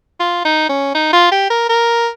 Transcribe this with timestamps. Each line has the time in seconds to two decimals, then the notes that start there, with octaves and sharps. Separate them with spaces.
0.20 F4
0.45 D#4
0.69 C#4
0.95 D#4
1.13 F4
1.32 G4
1.50 A#4
1.69 A#4